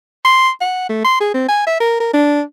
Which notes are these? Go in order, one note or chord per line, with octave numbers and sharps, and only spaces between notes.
C6
F#5
A3
C6
G#4
C4
G#5
E5
A#4
A#4
D4